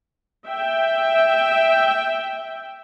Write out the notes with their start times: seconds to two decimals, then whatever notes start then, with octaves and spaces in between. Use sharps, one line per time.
0.46 E5 G5